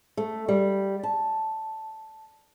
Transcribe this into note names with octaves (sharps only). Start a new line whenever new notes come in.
A3
G3
A5